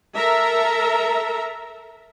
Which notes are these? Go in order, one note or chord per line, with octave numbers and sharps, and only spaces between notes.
A4 A#4 E5 A#5